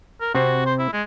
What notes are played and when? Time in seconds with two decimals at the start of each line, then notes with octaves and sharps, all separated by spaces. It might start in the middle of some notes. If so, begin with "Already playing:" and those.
0.21 A#4
0.35 C3 C4 F#4
0.66 C5
0.79 E4
0.93 G#3